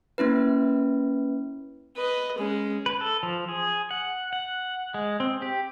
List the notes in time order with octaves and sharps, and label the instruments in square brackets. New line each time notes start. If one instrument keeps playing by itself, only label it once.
[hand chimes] A#3 C#4 E4 B4
[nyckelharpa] B4 D#5
G#3 C#4
[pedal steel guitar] B4
A4
F3
G#4
F#5
F#5
G#3
C4
G4